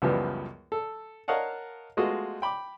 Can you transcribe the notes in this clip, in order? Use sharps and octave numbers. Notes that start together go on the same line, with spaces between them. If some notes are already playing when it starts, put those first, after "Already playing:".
C#2 F#2 E3 F3 G3 B3
A4
A#4 C#5 D#5 F5 F#5 A5
G#3 A3 B3 F4 F#4 D#5
G5 B5 D6